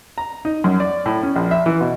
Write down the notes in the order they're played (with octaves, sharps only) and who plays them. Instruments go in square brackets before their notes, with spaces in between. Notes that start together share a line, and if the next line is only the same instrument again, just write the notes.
[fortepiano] A#5
D#4
F#2
D5
A2
C#4
A#1
E5
E3
B2